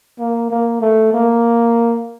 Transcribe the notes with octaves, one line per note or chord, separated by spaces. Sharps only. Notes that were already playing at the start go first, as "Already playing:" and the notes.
A#3
A#3
A3
A#3